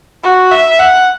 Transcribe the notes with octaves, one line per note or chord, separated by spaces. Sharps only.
F#4
E5
F#5